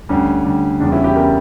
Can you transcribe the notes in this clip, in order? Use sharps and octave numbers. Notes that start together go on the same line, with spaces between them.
D2 D3 G3 C#4
D2 D3 G3
E2 C#3 G3 D4
C#4 E4
E4 G4
C#3 G3 G4 A#4